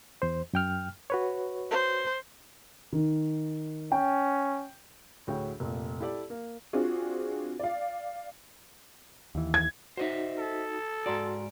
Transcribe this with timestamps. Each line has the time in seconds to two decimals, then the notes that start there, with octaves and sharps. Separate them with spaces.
0.22 E2 C5
0.53 F#2 G5 F6
1.10 F#4 B4 C#5
1.71 C5
2.93 D#3
3.92 C#4 G5
5.27 D2 A2 F#4 G#4 C#5 G5
5.60 F1 A#2
6.00 E4 G4 A4 D5
6.30 A#3
6.73 C4 D4 F4 F#4 G#4
7.59 D5 F5
9.35 D#2 E3
9.54 G#6
9.97 D#4 F#4 C5 D#5 E5
10.39 A4
11.06 G#2 F#4 D5 A#5 C6